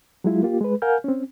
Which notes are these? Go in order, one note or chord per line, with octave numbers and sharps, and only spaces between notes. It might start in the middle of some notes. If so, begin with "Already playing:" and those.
F#3 G#3 E4 F4
A#3 F4 G4
G#3 B4
A#4 F5 F#5 G#5 F6 G6
C4 C#4